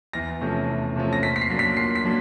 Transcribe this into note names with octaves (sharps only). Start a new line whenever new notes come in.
E2 A#6
C3 F3 A3 C#4
E2
C3 F3 A3 C#4
A#6
A#2 B6
B6
C7
F#3 A#3 D4
B6
A#2 C7
B6
F#3 A#3 D4